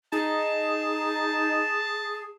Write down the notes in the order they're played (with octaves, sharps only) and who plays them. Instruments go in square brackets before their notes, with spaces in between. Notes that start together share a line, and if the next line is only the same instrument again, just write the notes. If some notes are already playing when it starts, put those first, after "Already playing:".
[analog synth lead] D#4 [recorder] G#4 [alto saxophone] A5